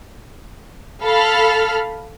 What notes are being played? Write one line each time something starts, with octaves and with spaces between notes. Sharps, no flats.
A4 F5 B5 F6